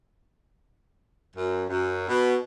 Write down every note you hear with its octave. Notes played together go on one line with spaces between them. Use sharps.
F#2
F#2
B2